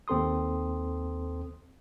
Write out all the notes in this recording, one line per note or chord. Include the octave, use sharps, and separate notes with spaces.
D#2 C4 A4 C6 D#6